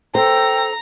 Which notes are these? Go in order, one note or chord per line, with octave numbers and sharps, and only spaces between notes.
A4 C5 G5 A#5